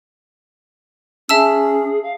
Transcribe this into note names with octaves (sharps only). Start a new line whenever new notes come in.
C#4 G#4 E5 A5 E6
F5